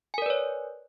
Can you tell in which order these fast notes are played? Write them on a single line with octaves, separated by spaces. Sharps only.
G#5 A#4 D5 B4 C#5